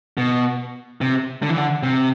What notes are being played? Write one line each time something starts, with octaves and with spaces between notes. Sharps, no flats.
B2
C3
D3
E3
D3
C3